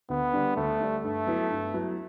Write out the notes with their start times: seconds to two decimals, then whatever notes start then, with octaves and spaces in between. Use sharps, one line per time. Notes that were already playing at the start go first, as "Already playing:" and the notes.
0.10 D2 B3
0.33 D3 G3 D4
0.56 D2 A3
0.80 D3 G3 D4
1.04 G2 A3
1.27 F#3 B3 E4
1.50 G2
1.74 F#3 B3 E4